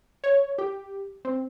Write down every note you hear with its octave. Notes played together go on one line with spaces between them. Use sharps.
C#5
G4
C4